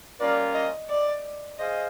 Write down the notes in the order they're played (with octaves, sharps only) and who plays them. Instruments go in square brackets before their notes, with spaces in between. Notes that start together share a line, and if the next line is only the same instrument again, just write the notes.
[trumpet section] G3 A#3 C#4 F4 A#4 [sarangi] D5
[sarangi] D#5
D5
[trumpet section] G#4 C5 F5 [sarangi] D#5